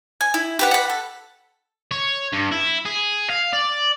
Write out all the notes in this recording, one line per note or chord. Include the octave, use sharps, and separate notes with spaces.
G#5
E4
G4 B4 F#5
F#5 B5
A4
C#5
G2
E4
G#4
F5
D5